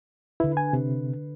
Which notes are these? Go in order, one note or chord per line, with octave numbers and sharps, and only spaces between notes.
D3 E4 B4
G#5
C3